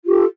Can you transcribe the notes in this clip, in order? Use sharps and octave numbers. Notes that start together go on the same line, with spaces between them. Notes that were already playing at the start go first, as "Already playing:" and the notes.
F4 G4 A4